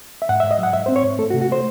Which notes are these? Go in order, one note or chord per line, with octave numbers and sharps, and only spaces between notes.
E5
G#2 F#5
G#2 E5
D#5
F#3 F#5
G#2 E5
C4 C5
C#5
G#2
A3 A4
F#4
C3
F#4
A3 C5